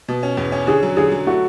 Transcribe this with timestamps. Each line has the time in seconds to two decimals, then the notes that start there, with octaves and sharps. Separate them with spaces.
0.09 B2
0.23 C#4
0.37 E2
0.52 C#4
0.67 D3 G#4
0.83 F#3
0.97 D3 G#4
1.11 F#3
1.27 A3 F#4